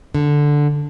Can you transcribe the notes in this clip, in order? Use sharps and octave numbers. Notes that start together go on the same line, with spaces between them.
D3